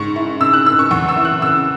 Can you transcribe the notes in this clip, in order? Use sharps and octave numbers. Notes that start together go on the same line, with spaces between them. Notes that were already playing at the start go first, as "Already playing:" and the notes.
Already playing: G#2 C#3 C#6
E4
C#3 E6
F#6
C#3 E6
C#6
E2 C#6
E6
E4
F#6
C#3 E6